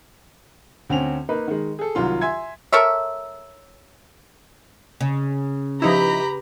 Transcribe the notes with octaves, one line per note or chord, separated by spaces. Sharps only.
D2 C4 C#4 G#5 F7
A#3 D#4 B4
D#3 G#3
G#4 A4
C2 D#3 F#3 F4 C6
E5 G#5 C6 G#6
A4 A#4 C#5 E5
C#3
F3 D#4 E4 G4 B4 A#5 B5